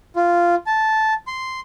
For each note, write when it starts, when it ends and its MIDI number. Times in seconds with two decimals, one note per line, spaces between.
0.16 0.55 65
0.67 1.14 81
1.27 1.60 84